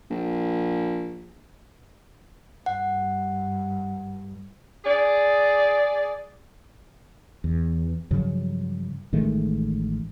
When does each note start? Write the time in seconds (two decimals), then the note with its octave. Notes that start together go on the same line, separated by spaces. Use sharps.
0.10 A#1
2.66 G2 F#5
4.85 G#4 D5
7.44 E2
8.11 G2 C#3 F3 F#3
9.13 A1 D#3 G#3 A3